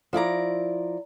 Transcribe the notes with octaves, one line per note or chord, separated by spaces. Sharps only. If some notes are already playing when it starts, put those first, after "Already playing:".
F3 E4 D5 A#5